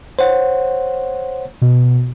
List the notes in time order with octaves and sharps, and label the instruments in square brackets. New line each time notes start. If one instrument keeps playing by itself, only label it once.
[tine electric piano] C5 C#5 F#5
[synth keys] B2